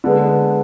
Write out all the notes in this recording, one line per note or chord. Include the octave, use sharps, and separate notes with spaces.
D3 G#3 B3